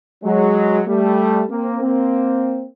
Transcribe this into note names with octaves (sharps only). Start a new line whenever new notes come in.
F#3 G#3
G3 A3
A#3 C4
A#3 C4